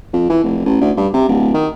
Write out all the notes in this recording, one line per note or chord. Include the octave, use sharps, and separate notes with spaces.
F2
E3
F1
A1
D2
G2
C3
D1
D#3